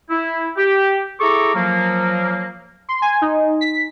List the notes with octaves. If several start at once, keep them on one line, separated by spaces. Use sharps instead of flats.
E4
G4
E4 G#4 A4 A#5 C#6 D6
F3 F#3 A#3
C6
G#5
D#4
B6